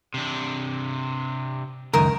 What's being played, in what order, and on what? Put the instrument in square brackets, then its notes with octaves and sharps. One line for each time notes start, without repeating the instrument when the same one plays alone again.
[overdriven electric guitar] C3 D4
[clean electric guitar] C#2 F#2 D#3 [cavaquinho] A#4 D#6